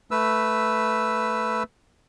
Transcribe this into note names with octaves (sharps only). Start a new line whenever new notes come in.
A3 B4 E6